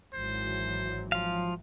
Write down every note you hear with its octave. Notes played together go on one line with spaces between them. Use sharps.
G#1 E3 F#3 C5
F3 F5